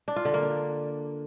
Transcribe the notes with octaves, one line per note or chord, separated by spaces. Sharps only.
D4
F4
D3
A#3
D4